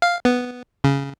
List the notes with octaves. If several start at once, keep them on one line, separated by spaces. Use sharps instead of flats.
F5
B3
C#3